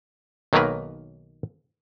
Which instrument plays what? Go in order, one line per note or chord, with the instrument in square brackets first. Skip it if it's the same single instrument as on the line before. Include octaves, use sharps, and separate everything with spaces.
[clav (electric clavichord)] B1 D#3 F#3 A#3 A#4 B4